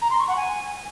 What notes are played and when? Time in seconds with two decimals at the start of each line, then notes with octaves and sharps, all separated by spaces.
0.01 A#5
0.10 C6
0.19 C#6
0.28 F#5
0.36 G#5